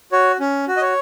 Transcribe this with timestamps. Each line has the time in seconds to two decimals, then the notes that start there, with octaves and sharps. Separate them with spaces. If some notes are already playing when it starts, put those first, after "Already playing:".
0.12 F#4 C#5
0.40 C#4
0.68 F#4
0.77 D#5
0.82 C#5